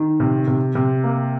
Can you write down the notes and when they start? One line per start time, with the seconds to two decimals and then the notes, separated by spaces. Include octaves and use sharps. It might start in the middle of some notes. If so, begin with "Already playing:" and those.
Already playing: D#3
0.20 C3
0.47 C3
0.75 C3
1.04 A#3